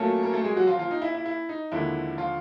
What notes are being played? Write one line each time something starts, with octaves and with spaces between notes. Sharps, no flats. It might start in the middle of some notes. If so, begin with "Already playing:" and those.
Already playing: A#2 F#3 A3 A#3 C#4 A4
A#4
A3 A4
G#3 G#4
F#3 F#4
F3 F4
F3 F4
D#4
E4
E4
E4
D#4
D#2 D3 F3 G#3 E4
F3 F4